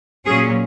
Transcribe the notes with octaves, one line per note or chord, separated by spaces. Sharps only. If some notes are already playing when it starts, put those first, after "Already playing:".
A#2 F#3 C#4 G#4